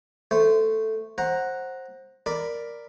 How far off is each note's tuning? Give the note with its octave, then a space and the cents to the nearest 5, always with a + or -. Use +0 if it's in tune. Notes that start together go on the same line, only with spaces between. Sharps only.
A3 +0 C5 -20
C5 +20 F#5 +0 A#5 +0
A#4 +0 D5 +0 B5 +0